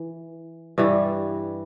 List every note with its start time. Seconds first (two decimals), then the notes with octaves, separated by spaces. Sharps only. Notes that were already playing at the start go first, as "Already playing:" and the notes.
Already playing: E3
0.78 G2 E3 G3